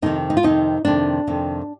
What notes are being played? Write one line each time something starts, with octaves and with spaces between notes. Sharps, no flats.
F2 C3 D#3 D#4
D#4
F4
F2 C3 D#3 D#4
F2 C3 D#3 D4
F2 C3 D#3